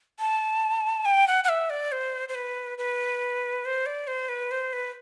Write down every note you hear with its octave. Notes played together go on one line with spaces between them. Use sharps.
A5
G5
F#5
F#5
E5
D5
C5
C5
B4
B4
C5
D5
C5
B4
C5
B4